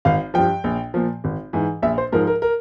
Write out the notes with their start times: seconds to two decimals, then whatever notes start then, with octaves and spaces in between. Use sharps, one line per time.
0.05 G#1 F5
0.34 G2 F3 G5
0.64 A#1
0.94 A#2 F3
1.24 G#1
1.53 G#2 E3
1.82 A#1 E5
1.98 C5
2.12 G#2 F3 A#4
2.27 A#4
2.42 A#4